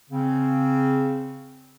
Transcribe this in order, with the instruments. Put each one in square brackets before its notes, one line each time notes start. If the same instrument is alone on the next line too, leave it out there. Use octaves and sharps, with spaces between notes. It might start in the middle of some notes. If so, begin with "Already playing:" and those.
[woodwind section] C#3 C4